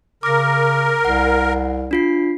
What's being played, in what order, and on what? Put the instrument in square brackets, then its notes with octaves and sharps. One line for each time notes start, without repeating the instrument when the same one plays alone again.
[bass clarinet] C#3 [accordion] A#4 [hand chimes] D6 A#6
[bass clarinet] C2 [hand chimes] F#5
[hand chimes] D4 F4 C7